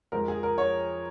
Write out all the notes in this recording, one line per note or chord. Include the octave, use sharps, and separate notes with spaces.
F2 F3 G#3 A#4
G#4
A#4
C#5